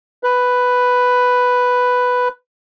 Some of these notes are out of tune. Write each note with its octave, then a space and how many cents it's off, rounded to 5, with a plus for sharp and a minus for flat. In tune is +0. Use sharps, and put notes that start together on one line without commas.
B4 +5